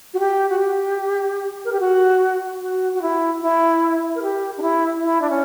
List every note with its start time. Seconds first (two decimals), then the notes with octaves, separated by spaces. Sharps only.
0.13 F#4
0.19 G4
0.49 F#4
0.59 G4
1.64 A#4
1.72 G4
1.80 F#4
2.60 F#4
2.94 F#4
3.02 E4
3.41 E4
4.15 A#4
4.22 G4
4.57 D4
4.62 E4
5.02 E4
5.21 D4
5.30 C#4